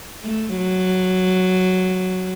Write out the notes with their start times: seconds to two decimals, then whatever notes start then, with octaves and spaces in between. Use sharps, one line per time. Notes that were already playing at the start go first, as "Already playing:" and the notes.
0.23 A3
0.57 F#3